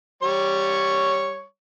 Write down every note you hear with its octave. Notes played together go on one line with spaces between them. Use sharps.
G3 C#5 C#6